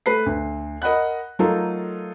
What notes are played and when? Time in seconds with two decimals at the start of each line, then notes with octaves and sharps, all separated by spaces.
0.06 A3 B4 C7
0.26 D2
0.82 A#4 D#5 F#5 B5 F#6
1.39 F#3 A3 D#4 F4 A4 A#4